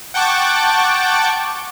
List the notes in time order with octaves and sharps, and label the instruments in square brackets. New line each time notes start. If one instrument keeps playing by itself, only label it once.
[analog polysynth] F#5 G5 A5 C#6 D6